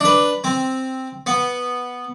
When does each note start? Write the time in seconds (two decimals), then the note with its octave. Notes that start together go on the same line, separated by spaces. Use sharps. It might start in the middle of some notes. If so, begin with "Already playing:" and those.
0.01 D4 B4
0.44 C4
1.26 B3